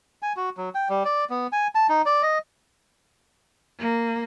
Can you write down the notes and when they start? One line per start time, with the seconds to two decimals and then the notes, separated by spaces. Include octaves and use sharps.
0.22 G#5
0.37 F#4
0.57 F#3
0.75 G5
0.89 G3
1.05 D5
1.30 B3
1.52 G#5
1.75 A5
1.89 D#4
2.06 D5
2.22 D#5
3.78 A#3